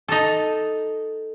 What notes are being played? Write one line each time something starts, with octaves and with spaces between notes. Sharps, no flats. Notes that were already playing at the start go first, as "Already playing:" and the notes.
D#4 A4